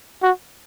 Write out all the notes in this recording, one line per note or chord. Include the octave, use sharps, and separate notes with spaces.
F#4